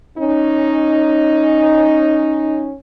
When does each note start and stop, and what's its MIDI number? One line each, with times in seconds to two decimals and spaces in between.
0.19 2.72 61
0.19 2.72 63